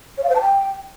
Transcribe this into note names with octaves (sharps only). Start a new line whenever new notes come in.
C#5
F5
C5
A5
G5